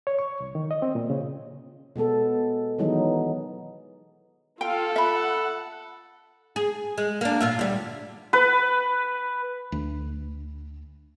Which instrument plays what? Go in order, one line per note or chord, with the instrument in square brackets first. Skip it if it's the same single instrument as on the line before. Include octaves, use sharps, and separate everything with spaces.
[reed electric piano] C#5
C#6
C2
D#3
D#5
C4
A#2
C#3
[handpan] B2 G#3 B3 A4
D#3 E3 F#3 G#3 B3 D#4
[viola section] F4 F5 [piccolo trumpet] A4 [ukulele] G5
[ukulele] E5 B5 [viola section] F#5
[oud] G#4
G#3
A#3 D4
A#2 F4 E5
D2 G3
[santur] B4
[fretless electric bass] D2